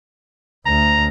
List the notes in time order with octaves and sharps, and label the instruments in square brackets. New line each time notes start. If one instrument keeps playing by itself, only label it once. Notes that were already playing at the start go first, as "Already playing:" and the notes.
[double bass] D2 A3 [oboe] A#5